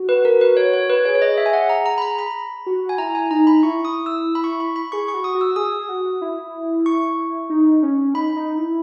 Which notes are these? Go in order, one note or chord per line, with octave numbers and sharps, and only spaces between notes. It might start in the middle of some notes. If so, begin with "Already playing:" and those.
Already playing: F#4
B4
A#4
B4
C#5
C#5
B4
G#4 C#5
C#5
D#5
E5
G#5
F#5
A#5
A#5
B5
A#5
B5
F#4
G#5
E4 A#5
G#5
D#4 A#5
B5
E4 C#6
D#6
E6
B5
C#6
B5
B5
G#4 C#6
C#6
F#4
D#6
F#4
E6
G#4 D#6
F#4
E4
C#6
D#4
C#4
D#4 B5
D#4
E4